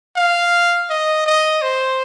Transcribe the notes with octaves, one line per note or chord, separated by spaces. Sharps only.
F5
D#5
D#5
C5